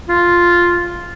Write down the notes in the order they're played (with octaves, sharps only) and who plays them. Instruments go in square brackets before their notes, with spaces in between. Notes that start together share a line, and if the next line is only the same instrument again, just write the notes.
[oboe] F4